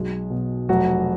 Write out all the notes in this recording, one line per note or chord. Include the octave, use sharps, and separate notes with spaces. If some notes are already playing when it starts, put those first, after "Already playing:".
Already playing: B1 G#3
B2
F1 F#3 F#4